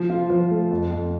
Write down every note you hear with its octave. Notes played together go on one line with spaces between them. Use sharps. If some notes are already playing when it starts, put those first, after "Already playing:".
Already playing: F3
F4
F3
A3
F2
F2